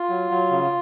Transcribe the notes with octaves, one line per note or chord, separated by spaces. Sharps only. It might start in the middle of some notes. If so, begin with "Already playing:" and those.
Already playing: F4
F#3
F#3
C#3